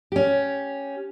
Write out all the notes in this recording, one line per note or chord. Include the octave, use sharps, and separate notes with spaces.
C#4 G4